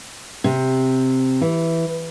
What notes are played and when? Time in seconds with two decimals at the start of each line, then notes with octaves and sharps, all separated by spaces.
0.44 C3
1.41 E3